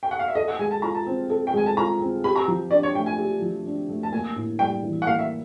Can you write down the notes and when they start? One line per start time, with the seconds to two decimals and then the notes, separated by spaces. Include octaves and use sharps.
0.03 G5
0.11 F#5
0.19 F5
0.28 E5
0.35 A4 D#5
0.48 F#5
0.59 G#3 G#5
0.71 A5
0.82 F4 A#5
0.95 A5
1.06 C4
1.30 A4
1.47 G5
1.54 G#3 G#5
1.66 A5
1.77 F4 A#5
2.01 C4
2.24 G4 B5
2.36 A#5
2.48 F3
2.71 D4 D5
2.83 C#5
2.95 A3 G5
3.06 G#5
3.18 G4
3.42 F3
3.66 D4
3.89 A3
4.03 A5
4.12 A#3 G#5
4.36 A2
4.59 G3 G5
4.83 E3
5.02 F#5
5.06 A#3 F5
5.19 E5